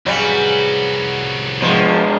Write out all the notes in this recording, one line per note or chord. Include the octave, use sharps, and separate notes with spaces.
C2 C#3 E3 F#3 G3 F#4
B2 F3 G#3 C#6